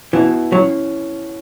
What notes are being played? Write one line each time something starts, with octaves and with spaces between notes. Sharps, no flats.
B2 E3 B3 E4
E3 F#3 C#4